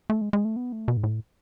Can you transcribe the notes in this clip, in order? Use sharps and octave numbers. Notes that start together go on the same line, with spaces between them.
A3
G#3
G#3
A3
B3
A3
B2
G#2
A2